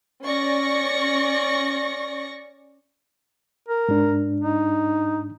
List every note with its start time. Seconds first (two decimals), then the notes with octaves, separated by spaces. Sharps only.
0.23 C#4 D5 C#6 A#6
3.69 A#4
3.89 G#2 D4
4.40 D#4